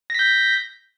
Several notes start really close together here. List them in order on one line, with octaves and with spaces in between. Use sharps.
A#6 B6 G6